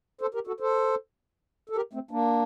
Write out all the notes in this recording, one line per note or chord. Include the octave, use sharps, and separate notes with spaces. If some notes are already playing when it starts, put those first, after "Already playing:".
A4 C5
G4 A#4
F#4 A4
A4 C5
A4
G4 A#4
A3 C4
A#3 D4